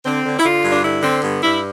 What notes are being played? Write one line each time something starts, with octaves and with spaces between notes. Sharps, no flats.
D3 C4
D3
E4
D3 F4
G2
D4
D3 E4
D3 C4
G2 B3
G2 E4